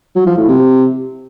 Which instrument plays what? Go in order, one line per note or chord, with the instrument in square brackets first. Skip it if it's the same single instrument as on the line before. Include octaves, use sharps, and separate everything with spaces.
[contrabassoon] F#3
F3
A2
C3